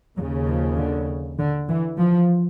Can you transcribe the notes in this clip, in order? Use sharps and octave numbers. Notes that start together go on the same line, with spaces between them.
D#2 C#3 F#3
F3
D3
D3
E3
F3